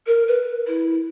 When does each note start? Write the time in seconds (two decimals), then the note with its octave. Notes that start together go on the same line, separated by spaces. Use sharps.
0.07 A#4
0.28 B4
0.67 E4